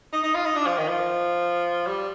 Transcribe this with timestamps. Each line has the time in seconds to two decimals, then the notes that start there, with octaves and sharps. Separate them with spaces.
0.13 D#4
0.23 D#4
0.34 F4
0.45 D#4
0.56 D4
0.66 F3
0.78 D#3
0.88 F3
1.87 G3